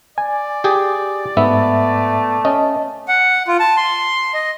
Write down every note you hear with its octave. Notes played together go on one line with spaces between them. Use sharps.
D5 G#5
G4 G#4 G5
G#2 A3 B3 E5
C#4 D#5 A5
F#5
F4
A5
C6
D#5